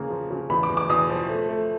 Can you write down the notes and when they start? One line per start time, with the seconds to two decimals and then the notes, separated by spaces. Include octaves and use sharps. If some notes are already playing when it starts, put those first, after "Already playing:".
Already playing: E2 C#3 A#3
0.10 F3
0.31 C#3
0.50 E2 B5
0.63 D6
0.70 E2
0.77 D6
0.89 E2 D#6
1.10 F3
1.29 A3
1.49 A3